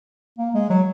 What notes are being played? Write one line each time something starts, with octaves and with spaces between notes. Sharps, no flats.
A#3
G#3
F#3